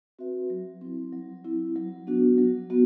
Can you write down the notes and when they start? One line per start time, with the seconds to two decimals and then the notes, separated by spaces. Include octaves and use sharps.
0.19 C4 F#4 B4 E5
0.50 F#3
0.81 C4 E4
1.13 F#3
1.45 C4 E4
1.76 F#3
2.07 B3 D4 F#4
2.38 F#3
2.70 B3 F#4